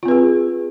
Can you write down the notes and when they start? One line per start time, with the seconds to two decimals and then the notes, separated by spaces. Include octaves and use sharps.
0.03 F4
0.06 C4
0.08 B4
0.11 G#4